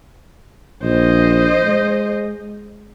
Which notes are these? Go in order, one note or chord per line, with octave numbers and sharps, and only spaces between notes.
A#1 C5 D#5
G#3